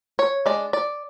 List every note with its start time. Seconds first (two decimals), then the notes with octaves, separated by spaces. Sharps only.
0.19 C#5
0.46 G#3 D4 D5
0.73 D5